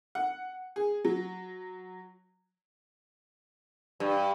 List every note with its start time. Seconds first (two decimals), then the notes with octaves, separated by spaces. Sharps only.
0.15 F#5
0.76 G#4
1.05 F#3
4.00 G2